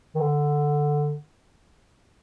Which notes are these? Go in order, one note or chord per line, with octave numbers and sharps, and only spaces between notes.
D#3
D3